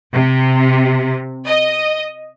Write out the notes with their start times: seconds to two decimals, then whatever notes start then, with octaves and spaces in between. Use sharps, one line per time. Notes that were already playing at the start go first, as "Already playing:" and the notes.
0.11 C3
1.48 D#5